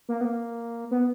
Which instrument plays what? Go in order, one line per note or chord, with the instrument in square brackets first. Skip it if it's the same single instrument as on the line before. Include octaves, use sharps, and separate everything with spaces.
[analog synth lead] A#3
B3
A#3
B3